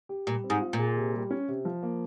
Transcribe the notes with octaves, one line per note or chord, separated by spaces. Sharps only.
G4
A#2 G3
C4
G#2
F4
A#2
G#4
C3
G3
C#4
C3
F3
A#3